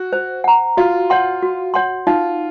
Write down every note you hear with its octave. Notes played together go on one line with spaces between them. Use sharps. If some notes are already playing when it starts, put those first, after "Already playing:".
Already playing: F#4
C5
F#5 A#5
F4 F#4
C#5 F#5 C6
F#4
C#5 F#5 C6
D#4 F4